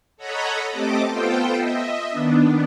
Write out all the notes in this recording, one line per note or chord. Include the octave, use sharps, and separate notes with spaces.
A4 C#5 D#5 F#5 A#5 B5
A3 C4 G4 A4 D#5 D6
B3 F4 A4 C5 G5
D#5 E5
D#3 B3 D4